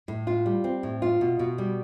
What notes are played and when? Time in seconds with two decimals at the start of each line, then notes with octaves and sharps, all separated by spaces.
0.08 A2
0.27 F4
0.46 G3
0.64 C4
0.83 A2
1.02 F4
1.21 B2
1.39 B2
1.58 G3